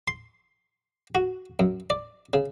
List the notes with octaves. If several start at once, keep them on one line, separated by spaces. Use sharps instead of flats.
C6
F#4
F#2
D5
C#3